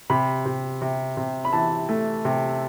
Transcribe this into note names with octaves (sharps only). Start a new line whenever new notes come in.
C3 B5
C3
C3
C3
B5
E3 A5
A3
C3